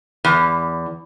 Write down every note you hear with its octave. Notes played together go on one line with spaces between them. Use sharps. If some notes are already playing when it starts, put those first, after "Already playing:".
E2